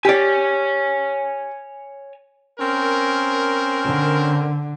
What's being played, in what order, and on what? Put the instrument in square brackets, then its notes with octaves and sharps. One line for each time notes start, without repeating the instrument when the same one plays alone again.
[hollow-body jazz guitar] G4 D5 [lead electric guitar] C#5 G#5
[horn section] C4 C#4 A#4
[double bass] D3